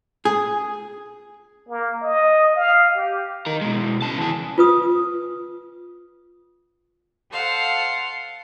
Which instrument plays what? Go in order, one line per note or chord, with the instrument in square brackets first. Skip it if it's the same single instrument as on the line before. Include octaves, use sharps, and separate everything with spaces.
[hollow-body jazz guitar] G#4
[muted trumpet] A#3
D#5
F5
G4
[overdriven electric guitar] D#4 A#4
B2 G#3
C#3 A5
E3 G#4
[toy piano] F4 B4 D#6
[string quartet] A4 C5 F5 F#5